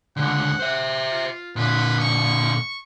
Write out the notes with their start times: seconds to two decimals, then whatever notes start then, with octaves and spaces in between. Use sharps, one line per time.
0.17 C#2 D3 F#5
0.60 C5 E5
1.11 F4
1.56 A#2 D3 B4
2.00 C#6